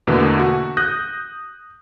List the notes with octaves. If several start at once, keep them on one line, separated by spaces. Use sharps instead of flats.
E2 B2 D3 E3 A3 A#3
F#4
D#6 F#6 G6 A#6